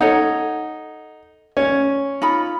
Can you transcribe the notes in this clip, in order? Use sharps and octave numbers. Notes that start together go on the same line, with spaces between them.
D#4 A4 C#5 F#5
C#4
D#4 F4 B5